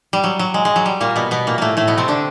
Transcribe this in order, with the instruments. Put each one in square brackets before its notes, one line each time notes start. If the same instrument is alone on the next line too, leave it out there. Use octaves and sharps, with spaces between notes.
[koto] G3
F#3
F#3
G#3
G#3
F#3
G3
A#2 A#3
B2 B3
B2 B3
A#2 A#3
A2 A3 A#3
A2 A3
B2 B3
C3 C4
D3 D4